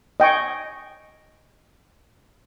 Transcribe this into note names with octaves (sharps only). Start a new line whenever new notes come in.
D#5 G5 G#5 C#6